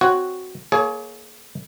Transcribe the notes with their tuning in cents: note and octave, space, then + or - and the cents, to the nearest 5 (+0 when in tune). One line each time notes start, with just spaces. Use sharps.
C4 -5 F#4 +0 C#5 +0
A#3 +0 G#4 +35 C#5 +0